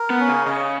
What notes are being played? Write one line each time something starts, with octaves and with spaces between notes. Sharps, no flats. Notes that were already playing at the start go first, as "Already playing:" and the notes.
Already playing: A#4
B3
C#4
C#3
C#3 D#5